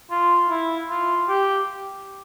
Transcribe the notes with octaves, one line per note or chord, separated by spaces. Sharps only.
F4
E4
F4
G4